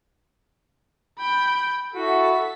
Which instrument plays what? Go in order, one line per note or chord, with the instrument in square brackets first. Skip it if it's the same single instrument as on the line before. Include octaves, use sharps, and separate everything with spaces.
[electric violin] G5 B5
[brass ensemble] E4 F#4 [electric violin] A4 B6